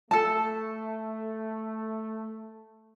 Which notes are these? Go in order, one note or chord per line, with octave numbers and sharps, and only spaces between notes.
A3 A4 A5